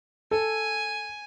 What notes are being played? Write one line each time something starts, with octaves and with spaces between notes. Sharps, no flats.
A4 G#5